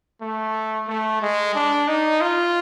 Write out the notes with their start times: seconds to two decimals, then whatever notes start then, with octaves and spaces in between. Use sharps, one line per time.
0.22 A3
0.88 A3
1.22 G#3
1.55 D4
1.88 D#4
2.21 F4